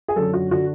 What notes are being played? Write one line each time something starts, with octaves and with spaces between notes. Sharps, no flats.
G#4
F#2 D3 A4
F#4
D3 F#4